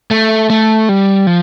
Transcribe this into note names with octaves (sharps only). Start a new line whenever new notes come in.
A3
A3
G3
F3